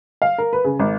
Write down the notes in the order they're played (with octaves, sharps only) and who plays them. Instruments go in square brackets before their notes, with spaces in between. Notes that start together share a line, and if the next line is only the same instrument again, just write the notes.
[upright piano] F5
A#4
B4
C#3
G#1